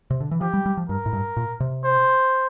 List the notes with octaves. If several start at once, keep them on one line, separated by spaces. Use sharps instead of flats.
C3
D3
E3
F3 G4
G3
G3
F3
G2 A#4
A2
G2
A#2
C3
C5